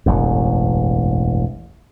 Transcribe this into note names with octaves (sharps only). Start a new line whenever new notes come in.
E1 A1 F#2